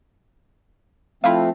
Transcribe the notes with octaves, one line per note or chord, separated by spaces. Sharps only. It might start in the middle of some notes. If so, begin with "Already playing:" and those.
F3 A3 C4 E4 F4 F5